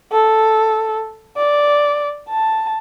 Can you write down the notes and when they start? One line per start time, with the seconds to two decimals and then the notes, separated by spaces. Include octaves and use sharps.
0.12 A4
1.36 D5
2.29 A5